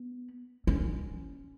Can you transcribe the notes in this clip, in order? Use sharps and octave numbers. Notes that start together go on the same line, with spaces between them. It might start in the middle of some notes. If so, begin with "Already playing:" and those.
Already playing: B3
C#4